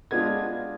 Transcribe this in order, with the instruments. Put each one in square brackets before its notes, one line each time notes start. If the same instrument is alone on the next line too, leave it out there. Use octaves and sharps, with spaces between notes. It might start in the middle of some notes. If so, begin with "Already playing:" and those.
[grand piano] G#3 B3 D4 F4 G#6